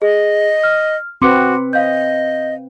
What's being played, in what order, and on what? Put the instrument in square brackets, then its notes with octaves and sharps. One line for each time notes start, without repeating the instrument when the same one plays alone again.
[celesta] G#4 [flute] D#5
[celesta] F6
[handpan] C4 B4 [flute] F#4 [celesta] C6 D6 C#7
[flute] D#5 [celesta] F5 G6